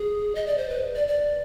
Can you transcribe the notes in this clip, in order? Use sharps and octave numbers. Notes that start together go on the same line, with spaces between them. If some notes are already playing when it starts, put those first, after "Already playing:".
Already playing: G#4
D#5
D5
C5
B4
D5
D5